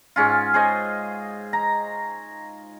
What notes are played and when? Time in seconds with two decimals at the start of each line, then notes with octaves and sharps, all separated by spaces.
0.16 G#2 C#4 F4
0.54 G#4 C5 C#5 D#5
1.53 A#5